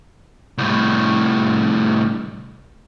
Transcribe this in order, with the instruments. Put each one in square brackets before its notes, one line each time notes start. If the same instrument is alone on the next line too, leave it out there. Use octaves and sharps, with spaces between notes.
[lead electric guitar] C2 A2